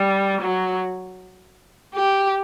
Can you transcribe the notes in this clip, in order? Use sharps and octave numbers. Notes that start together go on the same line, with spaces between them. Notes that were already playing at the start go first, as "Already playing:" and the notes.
Already playing: G3
F#3
G4